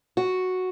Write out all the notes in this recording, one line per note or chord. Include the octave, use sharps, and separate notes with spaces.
F#4